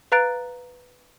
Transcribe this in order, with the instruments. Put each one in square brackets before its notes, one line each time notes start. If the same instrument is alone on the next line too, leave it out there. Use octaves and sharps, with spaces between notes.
[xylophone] B4 F5 A#5 F#6 A6 D7